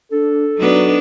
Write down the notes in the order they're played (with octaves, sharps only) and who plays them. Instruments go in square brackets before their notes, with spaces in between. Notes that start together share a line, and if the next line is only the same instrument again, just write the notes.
[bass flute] D4 [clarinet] A4
[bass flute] F#3 [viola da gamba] B3 D4 D#4